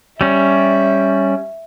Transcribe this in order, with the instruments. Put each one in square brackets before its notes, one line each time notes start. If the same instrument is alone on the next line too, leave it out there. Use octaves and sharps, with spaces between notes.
[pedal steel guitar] G3 C#4 [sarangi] E5